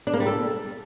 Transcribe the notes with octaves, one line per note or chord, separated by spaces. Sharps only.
D4
A#3
G3
A4